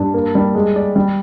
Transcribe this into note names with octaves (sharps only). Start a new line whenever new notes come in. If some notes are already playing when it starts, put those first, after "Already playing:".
Already playing: G2
A#3
G3
G#3
D5
G3